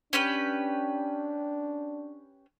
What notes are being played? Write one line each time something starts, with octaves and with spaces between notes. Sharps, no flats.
C#4 D4 G4 B4